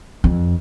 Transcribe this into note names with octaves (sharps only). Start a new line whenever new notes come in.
F2